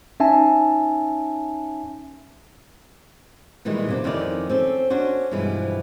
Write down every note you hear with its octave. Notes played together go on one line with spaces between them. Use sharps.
C#4 D#4 E5 G#5 A5
A#2 D#3 E3 G3 G#3
C3 A#3 D4
F2 D#3 C#4 E4 G#4 D5
C4 C#4 A4
C#4 D4 F#4 C5
G2 B2 E3 F3 G#3